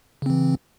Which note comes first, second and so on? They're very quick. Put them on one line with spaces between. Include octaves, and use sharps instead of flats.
C#3 C4 E3